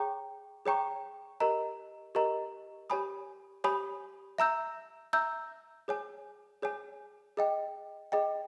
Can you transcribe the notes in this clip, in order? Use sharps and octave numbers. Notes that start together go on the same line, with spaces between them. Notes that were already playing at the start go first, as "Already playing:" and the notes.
Already playing: G#4 C#5 G5 A#5 C#6
G#4 C#5 G5 A#5 C#6
G4 A#4 D#5 A#5
G4 A#4 D#5 A#5
G4 C#5 G#5 B5 D#6
G4 C#5 G#5 B5 D#6
E5 A#5 E6 G6
E5 A#5 E6 G6
G#4 C#5 G#5
G#4 C#5 G#5
G#4 D#5 G5
G#4 D#5 G5